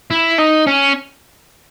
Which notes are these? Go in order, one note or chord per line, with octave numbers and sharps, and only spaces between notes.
E4
D#4
C#4